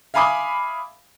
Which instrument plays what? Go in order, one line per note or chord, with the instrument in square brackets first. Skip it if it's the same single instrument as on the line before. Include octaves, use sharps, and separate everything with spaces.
[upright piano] E5 F5 G#5 B5 D6 D#6